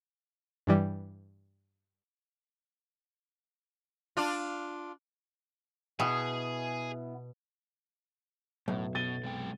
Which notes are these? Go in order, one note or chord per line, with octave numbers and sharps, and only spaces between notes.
G2 E3 G3
D4 F4
B2 B3 E4 G#4 D#5
B1 F#2 A2
B2 A6 D#7 G7
C3 G#3 G5